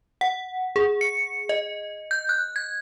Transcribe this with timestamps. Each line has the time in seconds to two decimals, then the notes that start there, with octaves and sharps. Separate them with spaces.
0.21 F#5
0.76 G#4
1.01 C#7
1.49 D#5
2.11 G6
2.29 F#6
2.56 G#6